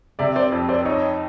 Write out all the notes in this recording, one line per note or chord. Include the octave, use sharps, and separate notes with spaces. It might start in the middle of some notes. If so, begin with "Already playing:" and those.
C3 D5 E5
C5 D5
F2
C5 D5
D#4 C#5 D#5